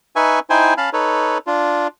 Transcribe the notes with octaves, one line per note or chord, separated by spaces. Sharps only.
D#4 B4 E5 G#5 C#6
D#4 E4 C5 G5 G#5
C#4 F5 A5 B5
D#4 A4 B4 C#5
D4 F4